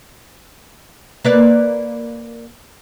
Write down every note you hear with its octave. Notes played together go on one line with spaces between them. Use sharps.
A#3 B4 D5